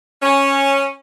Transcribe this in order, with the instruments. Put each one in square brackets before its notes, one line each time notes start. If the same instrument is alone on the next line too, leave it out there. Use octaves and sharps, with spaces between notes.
[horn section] C#4